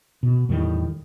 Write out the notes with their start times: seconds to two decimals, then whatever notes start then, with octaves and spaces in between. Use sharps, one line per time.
0.23 B2
0.49 E2 A2 D#3 G3